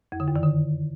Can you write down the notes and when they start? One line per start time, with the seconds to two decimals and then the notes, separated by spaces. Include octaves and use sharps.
0.12 F2
0.20 D3
0.28 F#2
0.36 D#3
0.43 D3